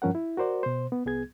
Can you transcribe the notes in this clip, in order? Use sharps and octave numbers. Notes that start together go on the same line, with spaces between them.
G2 F3 C#4 A#4 F#5
E4
F#4 A#4 C5 D5
B2 C5
B3
C2 B3 G#4 G#6